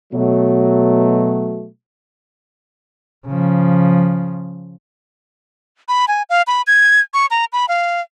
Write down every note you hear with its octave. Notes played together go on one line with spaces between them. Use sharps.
B2 F#3 A3
C#3 F3
B5
G#5
F5
B5
G#6
C#6
A#5
B5
F5